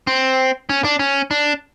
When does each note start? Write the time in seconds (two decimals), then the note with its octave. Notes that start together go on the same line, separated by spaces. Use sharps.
0.07 C4
0.69 C#4
0.84 D4
0.99 C#4
1.31 D4